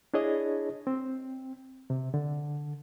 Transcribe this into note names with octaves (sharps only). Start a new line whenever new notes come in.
D4 E4 G#4 C#5 D#5
C4
C3
D3